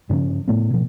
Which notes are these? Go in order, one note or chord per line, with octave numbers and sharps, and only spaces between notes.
G2 C#3 F3 C#4
A2 A3 B3
B2 F3